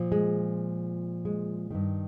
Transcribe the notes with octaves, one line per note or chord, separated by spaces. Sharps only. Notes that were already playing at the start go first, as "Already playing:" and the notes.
Already playing: A#2 F3
G#3
G#3
G2 D#3